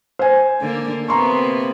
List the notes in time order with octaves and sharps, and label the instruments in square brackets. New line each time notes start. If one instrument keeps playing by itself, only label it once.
[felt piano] C5 G#5
[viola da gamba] D3 A#3
[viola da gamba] C3 A#3 B3 [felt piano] A#5 C6 C#6